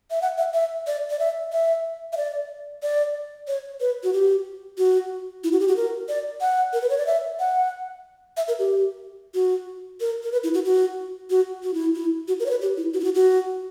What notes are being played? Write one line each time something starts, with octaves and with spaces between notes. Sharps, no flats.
E5
F#5
E5
E5
D5
D5
E5
E5
E5
D5
D5
C#5
B4
F#4
G4
F#4
E4
F#4
G4
F#4
A#4
D5
F#5
A#4
B4
C#5
D5
E5
F#5
E5
A#4
G4
F#4
A#4
A#4
B4
E4
F#4
F#4
F#4
F#4
E4
E4
F#4
A#4
C#5
B4
G4
E4
F#4
E4
F#4
F#4